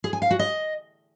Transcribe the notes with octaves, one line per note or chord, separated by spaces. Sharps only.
G#4
G#5
F5
F#4
D#5